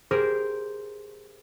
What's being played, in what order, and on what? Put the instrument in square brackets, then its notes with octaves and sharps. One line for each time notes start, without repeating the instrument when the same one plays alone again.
[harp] G4 G#4 A#4 C5